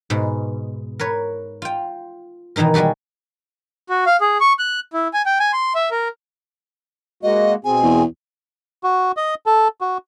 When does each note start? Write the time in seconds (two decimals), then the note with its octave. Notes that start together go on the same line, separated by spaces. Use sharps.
0.10 G#2 B2
0.99 A#4 B4 C#5
1.62 F4 G5
2.56 B2 D#3 E3 D#4 A#4
2.74 G3 G#3 F#4 G4 A4
3.88 F#4
4.06 F5
4.21 G#4
4.41 C#6
4.59 F#6
4.93 E4
5.13 G#5
5.26 G5
5.40 G#5
5.53 C6
5.75 E5
5.91 A#4
7.23 G#3 A#3 F#4 D#5
7.65 B2 C4 G#4 G#5
7.83 E2
8.84 F#4
9.17 D#5
9.46 A4
9.81 F#4